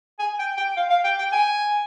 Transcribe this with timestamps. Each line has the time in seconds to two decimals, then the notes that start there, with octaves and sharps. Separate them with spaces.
0.19 G#5
0.39 G5
0.57 G5
0.77 F5
0.90 F5
1.04 G5
1.18 G5
1.32 G#5